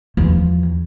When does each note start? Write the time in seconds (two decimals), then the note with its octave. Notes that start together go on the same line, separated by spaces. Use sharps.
0.17 E2 F3